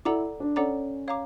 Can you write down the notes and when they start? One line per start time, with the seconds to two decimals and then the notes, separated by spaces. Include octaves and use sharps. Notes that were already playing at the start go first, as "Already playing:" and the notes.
0.05 E4 A4 D5 F#5 A#5 D6
0.40 D4
0.56 C#4 A4 D5 F#5 A#5 D6
1.08 C#5 F5 A#5 D6